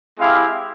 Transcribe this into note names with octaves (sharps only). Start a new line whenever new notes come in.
G#3 C4 E4 G4 F5